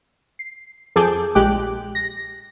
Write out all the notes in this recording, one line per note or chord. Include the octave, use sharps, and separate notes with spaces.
C7
F2 G#4 A4 A5 D6 G6
A#1 G#3 G4 G5 D6 F#6
A#6